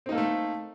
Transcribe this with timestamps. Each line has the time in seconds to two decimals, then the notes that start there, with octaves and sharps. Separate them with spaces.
0.06 C4
0.09 D#4
0.12 A#3
0.15 A4
0.18 A3